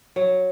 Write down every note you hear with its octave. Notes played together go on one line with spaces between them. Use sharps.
F#3